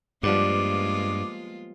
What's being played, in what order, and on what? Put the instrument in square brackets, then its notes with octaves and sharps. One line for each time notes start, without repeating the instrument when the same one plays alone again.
[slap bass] G2 [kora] F3 G3 B3 [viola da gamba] G#3 A#3 F4 [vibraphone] D6